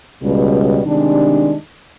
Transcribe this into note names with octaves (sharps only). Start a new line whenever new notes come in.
C#2 B2 G3
C3 D#3 G3 G#3 D4